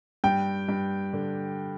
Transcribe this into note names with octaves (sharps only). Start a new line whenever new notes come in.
G2 G5
G2
D3